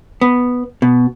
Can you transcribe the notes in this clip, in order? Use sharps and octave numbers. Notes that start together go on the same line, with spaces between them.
B3
B2